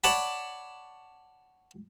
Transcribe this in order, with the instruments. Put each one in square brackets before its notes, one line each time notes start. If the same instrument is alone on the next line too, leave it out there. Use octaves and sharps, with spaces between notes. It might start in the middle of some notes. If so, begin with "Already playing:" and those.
[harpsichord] C#5 D5 F#5 A5 B5